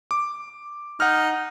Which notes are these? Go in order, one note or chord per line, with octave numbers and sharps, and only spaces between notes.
D6
D#4 F#5 F6